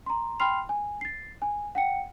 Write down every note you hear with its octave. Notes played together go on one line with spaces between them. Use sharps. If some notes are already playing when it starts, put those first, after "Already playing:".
A#5 C6
G5 B5 C6 F6 C7 F7
G#5
A6 C7
G#5
F#5 G5 C#7